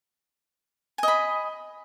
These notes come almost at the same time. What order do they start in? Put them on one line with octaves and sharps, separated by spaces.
G#5 D#5 B5